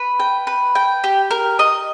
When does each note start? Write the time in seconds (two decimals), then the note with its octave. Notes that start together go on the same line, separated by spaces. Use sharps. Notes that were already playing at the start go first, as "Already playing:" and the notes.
Already playing: B4
0.20 G5
0.47 B4
0.75 G5
1.04 G4
1.31 A#4
1.59 D#5